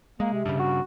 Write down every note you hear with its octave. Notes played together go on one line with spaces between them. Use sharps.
G#3 A#3
C3
G2 C#3
F#4